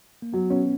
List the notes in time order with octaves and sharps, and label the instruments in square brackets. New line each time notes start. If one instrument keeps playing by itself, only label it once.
[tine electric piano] A#3
[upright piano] F#3 [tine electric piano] B3
[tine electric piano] B3 [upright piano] C#4